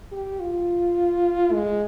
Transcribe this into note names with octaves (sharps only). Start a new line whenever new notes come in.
G4
F4
G#3